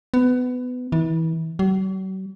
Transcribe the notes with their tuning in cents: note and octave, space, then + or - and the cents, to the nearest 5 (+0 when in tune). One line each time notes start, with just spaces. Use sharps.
B3 +20
E3 -30
F#3 +45